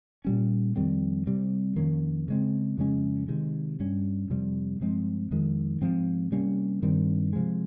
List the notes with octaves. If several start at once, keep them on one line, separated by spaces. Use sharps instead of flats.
A#2 G3 C#4
F2 D#3 G3 C4
C3 G3 C4
F2 D#3 A#3 C#4
C#3 G#3 C4
F2 C#3 G#3 C#4
C3 D#3 G#3
G2 G3 C#4
F2 C3 G3
G2 F3 G#3 C4
F2 D#3 G#3
G#2 F3 C4
C3 G3 A#3 C#4
G2 D#3 G3 C4
C3 F3 G#3